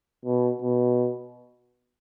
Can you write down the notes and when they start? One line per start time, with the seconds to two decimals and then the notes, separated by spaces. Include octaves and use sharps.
0.25 B2
0.61 B2